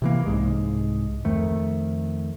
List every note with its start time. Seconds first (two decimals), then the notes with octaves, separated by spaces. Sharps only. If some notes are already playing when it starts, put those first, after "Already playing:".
0.02 C3 E3 A#3
0.26 C2 G#2 G#3
1.25 F2 D#3 A3